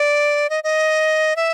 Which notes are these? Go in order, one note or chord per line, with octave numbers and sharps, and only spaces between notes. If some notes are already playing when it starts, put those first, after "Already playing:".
Already playing: D5
D#5
D#5
E5